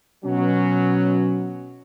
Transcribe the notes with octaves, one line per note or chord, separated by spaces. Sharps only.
B2 F#3 C#4